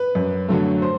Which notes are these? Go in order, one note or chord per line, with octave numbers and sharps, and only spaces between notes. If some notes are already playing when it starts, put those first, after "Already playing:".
Already playing: B4
F#2
D3 F#3 A3
C5